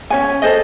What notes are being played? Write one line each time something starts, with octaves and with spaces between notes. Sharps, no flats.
C#4 F#4 C#5 G#5
A4 C5 D#5